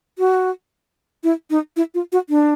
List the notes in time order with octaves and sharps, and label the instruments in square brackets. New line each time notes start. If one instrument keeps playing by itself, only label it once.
[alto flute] F#4
E4
D#4
E4
F4
F#4
D4